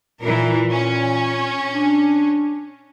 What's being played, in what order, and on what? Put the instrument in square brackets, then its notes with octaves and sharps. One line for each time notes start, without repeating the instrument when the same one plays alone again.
[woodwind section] A#2 [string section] E3 A#4
[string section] C#4
[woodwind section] D4